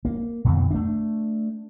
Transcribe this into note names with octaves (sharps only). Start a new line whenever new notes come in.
A#3
F2 B2 D3 D#3
A3 D4